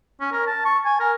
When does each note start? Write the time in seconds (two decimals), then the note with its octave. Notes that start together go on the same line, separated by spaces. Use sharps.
0.21 C#4
0.32 A#4
0.47 A5
0.65 C#6
0.85 G#5
1.00 A#4